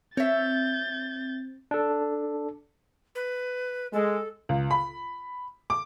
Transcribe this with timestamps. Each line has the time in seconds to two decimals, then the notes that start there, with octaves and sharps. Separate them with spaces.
0.17 C4 C#5 E5 G6 A6
1.71 D4 A4
3.15 B4
3.93 G#3 A4
4.49 C#2
4.71 B5
5.70 D6